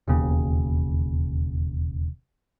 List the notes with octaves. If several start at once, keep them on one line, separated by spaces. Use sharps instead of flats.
E1 D#2 C#3